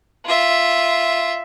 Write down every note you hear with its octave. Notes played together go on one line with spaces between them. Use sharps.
F4 E5